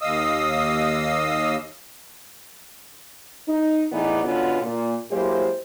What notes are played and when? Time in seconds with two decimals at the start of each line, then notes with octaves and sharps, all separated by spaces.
0.01 D#2 D#5 F5 D#6 E6
3.48 D#4
3.92 A2 E3 B3 D#4 G#4 D5
4.23 B2 D3 B3 C#4 F4
4.62 A#2
5.10 F#3 G#3 A#3 E4 G4 C5